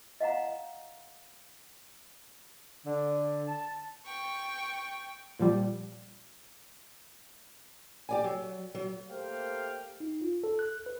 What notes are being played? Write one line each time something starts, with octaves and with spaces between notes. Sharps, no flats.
D#5 F5 F#5 A#5
D3
A5
G5 C#6
A#2 F3 G3
G4 D5 G#5
F#3
F#3
A3 A#3 G4 C5 F5 G5
D#4
F4
A4
F#6
B4